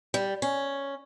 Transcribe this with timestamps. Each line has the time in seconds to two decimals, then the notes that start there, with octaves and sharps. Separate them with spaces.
0.14 G3
0.42 C#4